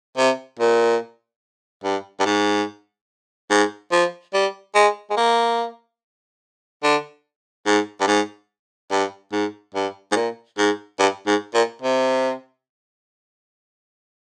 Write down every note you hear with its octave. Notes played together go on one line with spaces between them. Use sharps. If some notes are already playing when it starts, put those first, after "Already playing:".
C3
A#2
G2
G2
G#2
G#2
F3
G3
G#3
G#3
A#3
D3
G#2
G2
G#2
G2
G#2
G2
G#2
A#2
G#2
G2
G#2
A#2
C3